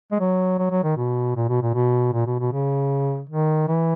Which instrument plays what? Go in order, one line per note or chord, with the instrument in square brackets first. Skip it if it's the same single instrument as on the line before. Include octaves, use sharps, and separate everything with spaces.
[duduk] G#3
F#3
F#3
F#3
D#3
B2
A#2
B2
A#2
B2
A#2
B2
B2
C#3
D#3
E3